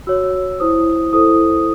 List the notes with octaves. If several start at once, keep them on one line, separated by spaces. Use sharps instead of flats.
F#4 C#5 E6
E4 C5 D#6
E4 A4 C5 D#6